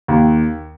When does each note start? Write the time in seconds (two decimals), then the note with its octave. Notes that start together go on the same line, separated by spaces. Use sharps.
0.08 D#2